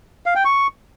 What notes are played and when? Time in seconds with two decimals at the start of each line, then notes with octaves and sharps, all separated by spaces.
0.26 F5
0.35 G5
0.45 C#6